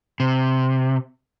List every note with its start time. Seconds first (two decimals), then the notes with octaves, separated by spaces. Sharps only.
0.20 C3